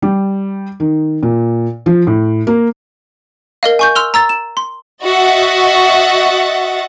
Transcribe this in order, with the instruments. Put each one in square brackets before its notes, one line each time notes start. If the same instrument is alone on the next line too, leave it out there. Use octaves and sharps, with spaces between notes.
[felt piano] G3
D#3
A#2
F3
A2
A#3
[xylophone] A#4 D#5 F5
G#5 C#6 G6
C6 E6 F6 F7 G7
A#5 E6 A6
E7
C6
[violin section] F#4 D#5 E5 F#5 A6